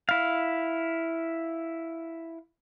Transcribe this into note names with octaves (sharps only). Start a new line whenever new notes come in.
E4 F5